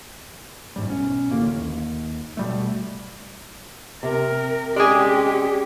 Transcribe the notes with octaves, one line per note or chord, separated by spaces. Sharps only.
A1 G#2 G3
B1 C#4
A1 D2 A2 A#3
D#2
B2 G3 A3
C3 A#4
G#3 C#4 G4 G#4 D5